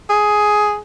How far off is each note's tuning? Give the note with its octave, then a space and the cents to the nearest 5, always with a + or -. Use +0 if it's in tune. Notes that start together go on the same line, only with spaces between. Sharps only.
G#4 +10